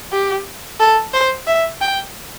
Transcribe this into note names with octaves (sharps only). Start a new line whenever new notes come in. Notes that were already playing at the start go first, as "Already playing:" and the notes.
G4
A4
C5
E5
G5